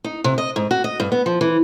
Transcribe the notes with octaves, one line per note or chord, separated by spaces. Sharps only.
D#4
C3
D#5
G#2
F#4
D#5
G2
B3
F3
E3